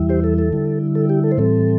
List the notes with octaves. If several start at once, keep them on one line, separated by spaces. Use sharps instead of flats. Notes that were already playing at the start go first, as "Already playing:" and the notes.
Already playing: E2 E3 G3 E4
G4 C5
A4
A4
D3 G3 E4
A4
G4
A4
C5
A2 E3 G3 C4 A4